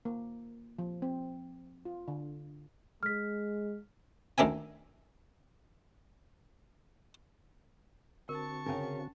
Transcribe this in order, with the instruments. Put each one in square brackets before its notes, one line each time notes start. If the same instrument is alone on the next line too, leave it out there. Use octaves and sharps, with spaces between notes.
[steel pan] A#3
F3
C4
F4
D3
[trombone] G#3 [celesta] F6 B6
[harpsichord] D2 D#3 D4 E5 G#5
[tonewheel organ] D3 C4 F#4 [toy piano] A#4 [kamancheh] A5 C#6
[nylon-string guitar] C#3 A#4 [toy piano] C#4 D4